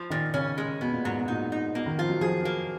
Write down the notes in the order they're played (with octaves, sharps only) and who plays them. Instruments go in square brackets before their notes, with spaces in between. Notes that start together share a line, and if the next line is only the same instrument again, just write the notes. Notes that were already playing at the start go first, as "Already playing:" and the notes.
Already playing: [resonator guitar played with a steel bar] F3
[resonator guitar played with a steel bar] A#2 [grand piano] D#3
[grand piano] C#3 [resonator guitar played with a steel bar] C#4
[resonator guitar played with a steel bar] G#3
[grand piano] B2 [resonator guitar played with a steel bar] B3
[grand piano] A#2
[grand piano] G#2 [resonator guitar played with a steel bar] F#3
[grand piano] B2
[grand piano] A#2 [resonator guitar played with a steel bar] D#4
[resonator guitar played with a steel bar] D#4
[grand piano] B2 [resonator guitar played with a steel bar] A#3
[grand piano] D#3
[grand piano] F3 [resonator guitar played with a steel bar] F4
[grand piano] F#3
[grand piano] F3 [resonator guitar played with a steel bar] G#4
[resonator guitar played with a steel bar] A#3